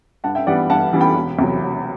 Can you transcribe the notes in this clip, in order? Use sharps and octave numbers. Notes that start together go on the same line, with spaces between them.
G2 F#5 A5
E5 G5
E3 G3 B3 D5 F#5
G2 F#5 A5
E3 G3 B3
G5 B5
E1
E2 C3 F#3
E1